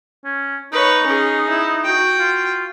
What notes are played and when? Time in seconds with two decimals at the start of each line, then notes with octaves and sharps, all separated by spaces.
0.25 C#4
0.73 D#4 B4 C#5
1.06 C#4 G#4
1.49 E4
1.84 F#4 G5
2.19 F4